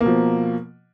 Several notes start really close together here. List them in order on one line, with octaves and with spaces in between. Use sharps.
A#3 B2 F3